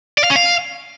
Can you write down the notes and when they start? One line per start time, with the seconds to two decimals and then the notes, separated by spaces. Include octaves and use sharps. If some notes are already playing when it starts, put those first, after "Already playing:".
0.18 D5
0.24 F5
0.30 C#4
0.36 F5